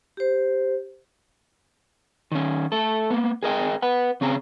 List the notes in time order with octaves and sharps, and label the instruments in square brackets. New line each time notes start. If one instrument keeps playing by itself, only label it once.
[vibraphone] G4 C5
[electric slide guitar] D#3 C#4
A3 A4
A#3 B3
G#4 A#4 D#5 G5
B4 F#5
C#3 C4 C#4 G#4 F5 A#5